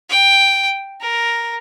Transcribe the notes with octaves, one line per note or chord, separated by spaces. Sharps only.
G5
A#4